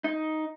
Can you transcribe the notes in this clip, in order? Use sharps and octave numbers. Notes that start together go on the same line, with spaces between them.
D#4